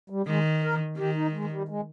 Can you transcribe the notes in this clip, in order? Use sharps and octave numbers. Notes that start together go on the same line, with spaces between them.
G3
D#3 G#3
A#4
D#3 G4
D#4
G#3
G3
G#3